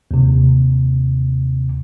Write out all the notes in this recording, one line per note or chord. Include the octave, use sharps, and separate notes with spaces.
D#2 C3